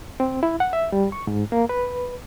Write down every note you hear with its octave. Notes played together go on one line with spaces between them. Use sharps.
C4
E4
F#5
E5
G3
C#6
G#2
A#3
B4